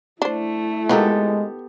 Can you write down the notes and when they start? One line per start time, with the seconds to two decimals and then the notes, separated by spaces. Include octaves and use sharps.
0.22 A3 D4 E4 C5
0.89 D#3 G#3 B3 F4 G4 A4 A#4